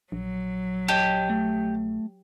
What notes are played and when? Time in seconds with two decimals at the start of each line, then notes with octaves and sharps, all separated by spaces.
0.12 A#1 F#3
0.88 G4 C#5 D#5 A5
1.30 A3